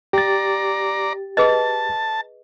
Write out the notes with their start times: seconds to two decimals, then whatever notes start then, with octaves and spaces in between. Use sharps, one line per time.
0.13 G4 D5 A#5 A6
1.37 G#4 B4 D#5 A5